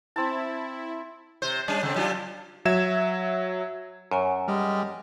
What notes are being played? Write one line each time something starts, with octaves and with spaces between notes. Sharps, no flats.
C4 E4 A5
C3 C5
G3 C#4 D4
C#3 C4
F#3 D4 F4
F#3 E5 G#6 E7
F#2 C#5 G#5 C#6
G3 G#3 D#5 F6